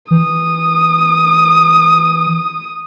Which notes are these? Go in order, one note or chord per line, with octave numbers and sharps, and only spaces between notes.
E3 D#6